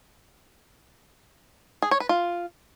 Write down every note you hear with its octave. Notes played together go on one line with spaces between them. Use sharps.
G#4
C#5
B4
F4